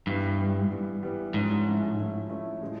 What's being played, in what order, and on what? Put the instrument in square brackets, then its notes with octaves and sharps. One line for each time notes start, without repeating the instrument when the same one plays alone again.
[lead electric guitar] G2 [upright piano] E3 G3 B3
[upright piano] E3 G3 B3
E3 G3 B3
E3 G3 B3
[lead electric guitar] G#2 [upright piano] F3 A3 C#4 E4
[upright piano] F3 A3 C#4 E4
F3 A3 C#4 E4
F3 A3 C#4 E4
A2 F3 G#3 C#4